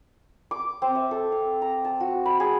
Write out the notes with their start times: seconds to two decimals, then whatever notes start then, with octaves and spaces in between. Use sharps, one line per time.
0.51 D6
0.82 C4
0.95 E5
1.11 A4
1.32 F5
1.62 A#5
1.85 A5
2.00 F#4
2.26 B5
2.40 G#4